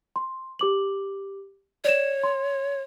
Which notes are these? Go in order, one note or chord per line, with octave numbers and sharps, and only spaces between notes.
C6
G4 D6 F#7
C#5 D5 E7
C6